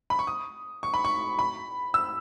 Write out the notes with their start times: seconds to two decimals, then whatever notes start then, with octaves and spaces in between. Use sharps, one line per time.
0.10 B5
0.19 C#6
0.27 D#6
0.83 C#6
0.94 B5
1.05 C#6
1.39 B5
1.94 E6